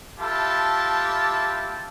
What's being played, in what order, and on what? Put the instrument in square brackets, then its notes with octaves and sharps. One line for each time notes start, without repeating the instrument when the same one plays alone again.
[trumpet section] E4 F4 G4 A4 A5